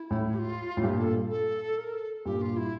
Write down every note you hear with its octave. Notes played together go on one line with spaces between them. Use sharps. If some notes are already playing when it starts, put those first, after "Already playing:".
Already playing: E4
A2
G4
F4
A2
G2 A#2 G4
A4
A4
A#4
A4
G2 A#2 G4
F4
E4